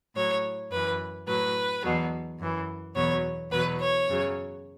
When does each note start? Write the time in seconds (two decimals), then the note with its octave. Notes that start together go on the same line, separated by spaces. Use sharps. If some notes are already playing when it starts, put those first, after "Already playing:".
0.16 A2 F#3 C#5
0.71 F#2 E3 B4
1.27 A2 F#3 B4
1.83 E2 B2 F#3
2.39 F#2 E3
2.95 E2 B2 F#3 C#5
3.51 E2 B2 F#3 B4
3.79 C#5
4.07 F#2 C#3 F#3